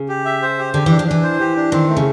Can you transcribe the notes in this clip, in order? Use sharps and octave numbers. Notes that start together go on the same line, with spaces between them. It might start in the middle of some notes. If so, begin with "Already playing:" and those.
Already playing: C#3
G4
E5
C5
G4
D3 G4
E3 D4
F3
E3 D4
C5
G4
D4
D#3 C4
A3
C#3